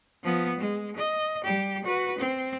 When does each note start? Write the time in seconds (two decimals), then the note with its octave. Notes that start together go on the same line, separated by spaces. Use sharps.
0.23 F3 B3
0.59 G#3
0.96 D#5
1.44 G3 G4
1.84 F#4 B4
2.18 C4